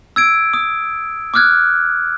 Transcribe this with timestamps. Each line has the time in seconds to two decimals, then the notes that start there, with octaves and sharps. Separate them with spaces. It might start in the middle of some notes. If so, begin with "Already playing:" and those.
0.16 E6 G#6 D7
0.54 D#6
1.34 D6 D#6 F6 F#6 G#6